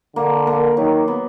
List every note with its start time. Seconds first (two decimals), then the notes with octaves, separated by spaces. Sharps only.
0.16 D3 A#3
0.47 A#3
0.77 D#3 F#3
1.08 B3